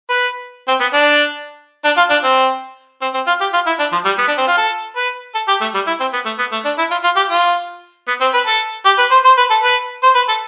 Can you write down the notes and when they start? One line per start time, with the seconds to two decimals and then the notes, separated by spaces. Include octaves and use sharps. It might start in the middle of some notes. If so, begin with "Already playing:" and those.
0.09 B4
0.68 C4
0.80 B3
0.93 D4
1.85 D4
1.97 F4
2.10 D4
2.24 C4
3.02 C4
3.14 C4
3.27 F4
3.41 G4
3.53 F4
3.67 E4
3.79 D4
3.92 F3
4.05 G3
4.19 B3
4.28 D4
4.38 C4
4.48 F4
4.57 A4
4.96 B4
5.35 A4
5.48 G4
5.61 A3
5.74 G3
5.87 E4
6.00 C4
6.13 B3
6.26 A3
6.39 B3
6.52 A3
6.65 D4
6.79 E4
6.91 F4
7.04 F4
7.17 G4
7.30 F4
8.08 B3
8.21 C4
8.34 B4
8.47 A4
8.86 G4
8.98 B4
9.11 C5
9.25 C5
9.38 B4
9.51 A4
9.63 B4
10.03 C5
10.15 B4
10.29 A4